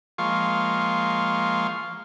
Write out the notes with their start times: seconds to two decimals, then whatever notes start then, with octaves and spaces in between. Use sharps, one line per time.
0.18 F3 G#3 A#3 F4 F5 C#6